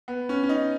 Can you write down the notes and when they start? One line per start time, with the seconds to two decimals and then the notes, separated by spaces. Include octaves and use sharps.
0.08 B3
0.29 C#4
0.43 C#4
0.49 D#4